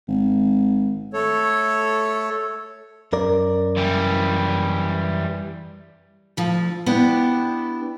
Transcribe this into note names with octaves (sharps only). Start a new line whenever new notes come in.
G#1
A3 A4 C#5
F#2 A#4 D5
E3 G3
D2 F3
B3 D4 E4 G4